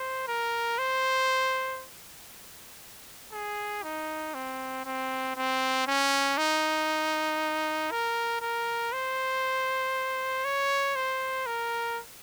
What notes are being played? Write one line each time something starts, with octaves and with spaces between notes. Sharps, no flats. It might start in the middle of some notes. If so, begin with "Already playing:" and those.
Already playing: C5
A#4
C5
G#4
D#4
C4
C4
C4
C#4
D#4
A#4
A#4
C5
C#5
C5
A#4